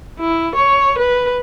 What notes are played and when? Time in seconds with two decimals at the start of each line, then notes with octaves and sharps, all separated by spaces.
0.20 E4
0.55 C#5
0.98 B4